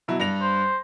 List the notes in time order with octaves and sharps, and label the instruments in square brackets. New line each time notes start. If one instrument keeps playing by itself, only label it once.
[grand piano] B2 F#3 E4
G2 A#6 F7
[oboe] C5